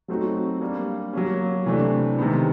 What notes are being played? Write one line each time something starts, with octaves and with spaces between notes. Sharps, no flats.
F#3 A3 C4 D#4 F#4
G3 A#3 D4
F#3 A#3 C#4
C3 E3 A3 D4
C3 D#3 G#3 B3